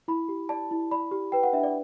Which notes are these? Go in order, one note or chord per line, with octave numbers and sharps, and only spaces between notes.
E4 B5
G4
D5 A5
E4
D5 B5
G4
B4 G5
F#5
D4 E5
D5